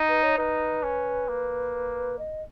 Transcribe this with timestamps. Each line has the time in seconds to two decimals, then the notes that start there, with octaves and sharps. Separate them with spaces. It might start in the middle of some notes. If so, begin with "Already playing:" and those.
Already playing: D#4
0.09 B4
0.23 C#5
0.38 D#4 B4
0.83 C#4
1.28 A#3
2.19 D#5